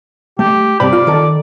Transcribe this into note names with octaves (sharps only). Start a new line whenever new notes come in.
A3 G4
G2 C3 D5 B5
F4
D#3 A4